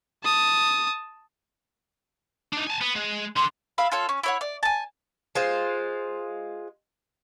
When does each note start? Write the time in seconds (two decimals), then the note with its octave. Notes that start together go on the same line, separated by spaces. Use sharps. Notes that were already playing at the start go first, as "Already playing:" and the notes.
0.24 A5 D#6
2.53 D4 D#4
2.67 G#5 A5
2.81 B3
2.95 G#3
3.36 D3 C6
3.78 E5 F5 B5
3.92 F4 A4 C#5
4.09 C#4
4.23 E4 C#5 F#5
4.41 D5
4.63 G#5 A5
5.35 G#3 F4 C5